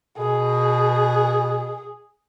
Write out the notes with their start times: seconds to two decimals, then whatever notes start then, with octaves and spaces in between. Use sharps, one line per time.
0.18 B2 G#4